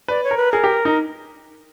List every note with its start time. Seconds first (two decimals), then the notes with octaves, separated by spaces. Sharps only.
0.08 B4 D5
0.24 C#5
0.31 A#4
0.37 B4
0.52 G#4 A#4
0.64 G4
0.85 D#4